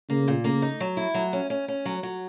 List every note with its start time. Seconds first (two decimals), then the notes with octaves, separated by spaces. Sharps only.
0.09 C#3 A#3
0.28 A#2
0.44 C#3 A#3
0.62 D#4
0.80 F#3
0.97 E4
1.14 F#3
1.33 C#4
1.50 C#4
1.68 C#4
1.85 F#3
2.03 F#3